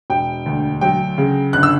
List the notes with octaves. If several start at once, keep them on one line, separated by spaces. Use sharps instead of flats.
E1 G5
D2
F#3 G5
C#3
G1 F#6
E6